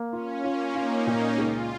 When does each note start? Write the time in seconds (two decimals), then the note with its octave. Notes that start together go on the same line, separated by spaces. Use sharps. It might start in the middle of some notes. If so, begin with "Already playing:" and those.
Already playing: A#3
0.13 C#4 F4
0.44 A#3 F4
0.75 D#4 F4
1.07 A#2
1.38 C#2 F4